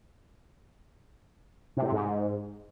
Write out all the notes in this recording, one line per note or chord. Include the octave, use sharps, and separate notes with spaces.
C3
A2
C3
G#2